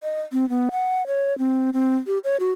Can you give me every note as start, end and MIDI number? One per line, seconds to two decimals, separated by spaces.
0.03 0.21 75
0.32 0.48 60
0.49 0.69 59
0.71 1.06 78
1.07 1.37 73
1.38 1.70 60
1.73 1.96 60
2.07 2.18 67
2.24 2.37 73
2.40 2.52 66